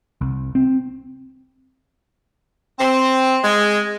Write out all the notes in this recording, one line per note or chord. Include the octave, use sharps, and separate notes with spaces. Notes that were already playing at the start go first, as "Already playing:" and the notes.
C2
C4
C4
G#3